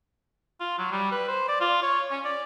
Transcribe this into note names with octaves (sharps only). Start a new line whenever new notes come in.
F4
F#3
G3
B4
C5
D5
F4
C#5
C#4
D5